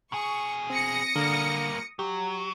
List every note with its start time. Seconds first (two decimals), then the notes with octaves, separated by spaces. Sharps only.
0.12 B2 G#4 C#6
0.70 C4 D#6 A#6 C#7
1.16 D3 G3 A#3
1.99 F#3 G4